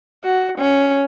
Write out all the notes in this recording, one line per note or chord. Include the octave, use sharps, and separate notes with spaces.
F#4
C#4